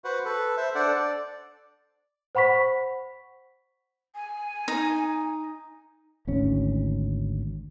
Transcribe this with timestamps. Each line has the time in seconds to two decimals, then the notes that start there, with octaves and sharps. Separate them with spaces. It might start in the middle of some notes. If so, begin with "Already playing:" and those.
0.04 F#4 B4 C5 F#5
0.25 A4 B4
0.57 C5 E5
0.75 D4 A4 C5 D5 F#5
0.95 D5
2.35 C5 F#5 B5 C#6 B6
4.15 G#5
4.68 D#4
6.27 G#1 D2 C#4